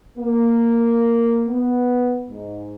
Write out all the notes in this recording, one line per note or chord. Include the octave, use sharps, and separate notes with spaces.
A#3
B3
G#2